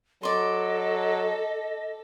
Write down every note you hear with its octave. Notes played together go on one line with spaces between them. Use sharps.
F#3 A4 D5 D#5 C6